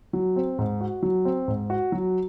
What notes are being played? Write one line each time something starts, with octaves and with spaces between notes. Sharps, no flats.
F#3
C4
G#2
F#4
F#3
C4
G#2
F#4
F#3